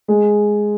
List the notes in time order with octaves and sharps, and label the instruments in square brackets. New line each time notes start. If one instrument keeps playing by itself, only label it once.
[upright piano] G#3